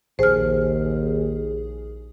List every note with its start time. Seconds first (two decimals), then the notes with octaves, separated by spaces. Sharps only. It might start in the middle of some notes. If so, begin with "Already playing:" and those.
0.19 A#1 D#2 G#4 C5 F6